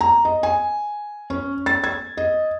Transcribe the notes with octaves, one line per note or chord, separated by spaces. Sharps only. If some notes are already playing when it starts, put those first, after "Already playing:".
A#5
D#5
G#5
C#4
A6
G#6
D#5